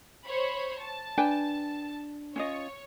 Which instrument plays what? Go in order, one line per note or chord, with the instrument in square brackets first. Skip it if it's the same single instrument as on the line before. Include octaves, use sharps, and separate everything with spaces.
[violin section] C5 C#5 B5
A5
[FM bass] D4 [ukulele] B4 G5 G#5
[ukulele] C#4 F4 D#5 [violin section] C#5